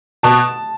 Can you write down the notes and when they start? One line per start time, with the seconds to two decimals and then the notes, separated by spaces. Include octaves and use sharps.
0.23 B2 A5